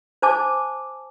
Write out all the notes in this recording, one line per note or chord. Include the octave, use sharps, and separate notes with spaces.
C5 G#5 A5 D6